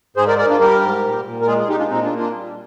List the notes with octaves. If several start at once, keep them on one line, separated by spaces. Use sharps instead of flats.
G#2 G#4 C5
A#4 D5
A#3 A#4 D5
D4 F4
G3 G4 A#4
G#2
A#2
A#2
A#4
G#3 F4 G#4
G#4
G#3 D#4 G4
D4 F4
A#2 C4 D#4
D4 F4
A#3
D4 F4
G3